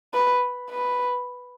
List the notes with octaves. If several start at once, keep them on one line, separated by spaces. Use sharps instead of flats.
B4
B4